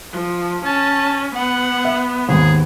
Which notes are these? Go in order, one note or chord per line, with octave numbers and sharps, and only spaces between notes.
F3
C#4 A5
B3 F#5
E5
D#2 G#2 G#4